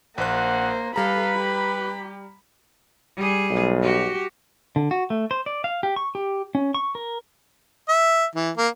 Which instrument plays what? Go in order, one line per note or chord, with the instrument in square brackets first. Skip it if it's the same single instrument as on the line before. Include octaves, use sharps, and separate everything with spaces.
[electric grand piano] A#1 F#6 [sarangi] A#3 [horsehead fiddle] C5 [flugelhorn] F#5
[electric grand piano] G3 A#5 [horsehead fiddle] A4 F5 [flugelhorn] B4 [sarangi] B5
[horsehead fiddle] G4
[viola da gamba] G3 G#4
[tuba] B1
[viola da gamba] F#4 G4
[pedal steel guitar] D3
F#4
A3
C5
D5
F5
G4
C#6
G4
C#4
C#6
A#4
[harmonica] E5
E3
A#3